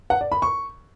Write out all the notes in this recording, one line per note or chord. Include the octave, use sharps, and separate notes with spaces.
F#5
D5
B5
C#6